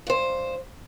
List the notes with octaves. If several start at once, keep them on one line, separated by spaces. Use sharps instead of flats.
G2 C5